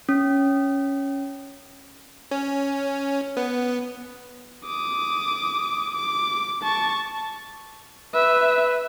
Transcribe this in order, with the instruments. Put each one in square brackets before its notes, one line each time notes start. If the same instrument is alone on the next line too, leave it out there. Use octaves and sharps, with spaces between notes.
[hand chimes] C#4
[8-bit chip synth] C#4
B3
[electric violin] D6 D#6
D6
A5 C#6
[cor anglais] B4 [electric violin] E5